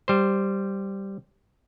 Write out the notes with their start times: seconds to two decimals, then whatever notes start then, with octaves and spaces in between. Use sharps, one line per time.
0.08 G3 C5